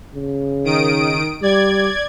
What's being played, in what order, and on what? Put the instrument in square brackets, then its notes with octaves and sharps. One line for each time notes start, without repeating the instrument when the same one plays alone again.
[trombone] C#3
[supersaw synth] D#3 D#6 D7
[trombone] G3 [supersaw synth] D5 G#6